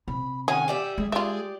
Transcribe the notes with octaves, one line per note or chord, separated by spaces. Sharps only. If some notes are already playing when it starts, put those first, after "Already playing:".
C3 B5
D#3 C#4 G#4 F#5 G#5
G3 G4 D5 E5
G#3 G#4
F4 G4 G#4 D5 E5